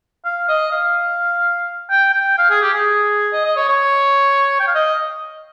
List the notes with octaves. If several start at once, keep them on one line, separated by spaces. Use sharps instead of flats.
F5
D#5
F5
G5
G5
F5
G#4
G4
G#4
D#5
D#5
C#5
C#5
G5
F5
D#5